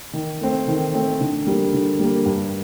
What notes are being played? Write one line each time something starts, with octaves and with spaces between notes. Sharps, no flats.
D#3
A3 C4
D#3
A3 C4
D3
G3 A#3
D3
G3 A#3
G2